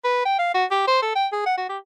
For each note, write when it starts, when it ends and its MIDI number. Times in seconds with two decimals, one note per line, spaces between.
0.04 0.21 71
0.25 0.37 79
0.39 0.50 77
0.54 0.65 66
0.71 0.83 67
0.87 1.01 72
1.02 1.12 69
1.15 1.27 79
1.32 1.43 68
1.46 1.56 78
1.57 1.67 66
1.69 1.78 67